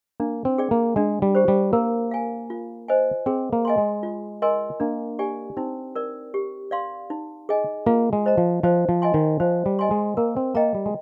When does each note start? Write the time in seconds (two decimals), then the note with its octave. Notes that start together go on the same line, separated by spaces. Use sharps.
0.20 A#3 D4
0.45 C4
0.58 G#4 D5 G5
0.71 A#3
0.96 G#3 D4
1.22 G3
1.35 G4 C5
1.48 G3
1.73 A#3 A#4
2.11 F5 G#5
2.50 F4
2.88 C5 D#5 G#5
3.26 C4 G#4
3.53 A#3
3.65 D#5 G#5 C6
3.78 G#3
4.03 F4
4.42 A#4 D#5 G#5 C6
4.80 A#3 D4
5.19 G4 D5 G#5
5.57 C4 D#4
5.96 A#4 D5
6.34 G4
6.71 D5 F5 C6
7.10 D#4
7.49 G#4 D#5 G#5
7.86 A#3 F4
8.13 G#3
8.26 C5 D#5 A#5
8.38 F3
8.63 F3 C5
8.89 F3
9.02 D#5 G#5 C6
9.14 D#3
9.40 F3 C5
9.66 G3
9.79 D#5 G#5 C6
9.91 G#3
10.17 A#3 A#4
10.37 C4
10.55 A#3 D#5 G5 A#5
10.75 G3
10.86 G#3